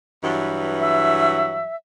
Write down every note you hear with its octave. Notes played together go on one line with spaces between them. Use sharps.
G2 E3 F#3
E5